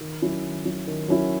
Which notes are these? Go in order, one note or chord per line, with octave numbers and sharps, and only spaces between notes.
D#3
F#3 C#4 E4
D#3
F#3 C#4 E4
D#3
F#3 C#4 E4